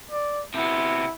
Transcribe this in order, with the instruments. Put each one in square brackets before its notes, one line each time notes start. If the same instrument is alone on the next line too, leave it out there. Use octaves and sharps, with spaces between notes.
[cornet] D5
[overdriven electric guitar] C3 B3 [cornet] E4